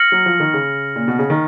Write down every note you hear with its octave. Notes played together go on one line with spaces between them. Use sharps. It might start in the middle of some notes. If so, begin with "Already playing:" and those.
Already playing: F6 A#6 C#7 F#7
F#3
F3
D#3
C#3
A#2
B2
C#3
D#3